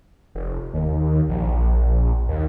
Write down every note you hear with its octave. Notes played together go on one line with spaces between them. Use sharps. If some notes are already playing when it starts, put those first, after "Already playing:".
F1
D#2
A#1
D#2